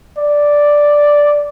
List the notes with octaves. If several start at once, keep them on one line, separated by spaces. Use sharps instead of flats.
D5